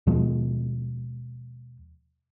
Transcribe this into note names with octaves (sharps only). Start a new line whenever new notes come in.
D#2 B2 F3 G#3